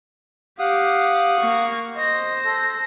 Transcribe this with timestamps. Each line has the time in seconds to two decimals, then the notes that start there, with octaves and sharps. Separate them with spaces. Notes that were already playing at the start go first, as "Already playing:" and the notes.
0.59 G4 F5 F#5 D6 D#6
1.38 A#3 C#6
1.95 C5 D#5 A#6
2.45 A4